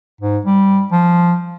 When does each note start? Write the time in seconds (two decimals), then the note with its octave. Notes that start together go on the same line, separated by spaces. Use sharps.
0.21 G#2
0.45 G3
0.92 F3